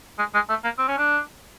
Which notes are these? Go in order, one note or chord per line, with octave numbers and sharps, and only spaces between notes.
G#3
G#3
A3
A#3
C4
C#4
D4